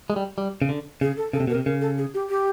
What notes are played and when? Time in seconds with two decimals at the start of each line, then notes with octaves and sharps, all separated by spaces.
0.10 G#3
0.16 G3
0.38 G3
0.62 C#3
0.69 D3
1.01 C#3 G#4
1.17 A4
1.33 C#3 A4
1.40 C3
1.47 B2 A#4
1.55 C3
1.66 C#3 A#4
1.81 A4
1.98 G#4
2.14 G4
2.30 G4